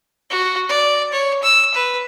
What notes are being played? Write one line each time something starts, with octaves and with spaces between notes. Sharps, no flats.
F#4
D5
C#5
E6
B4